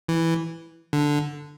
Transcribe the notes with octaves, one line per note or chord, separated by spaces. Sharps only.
E3
D3